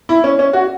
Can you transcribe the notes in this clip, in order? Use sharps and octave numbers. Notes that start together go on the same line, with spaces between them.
E4
C#4
C#4
F#4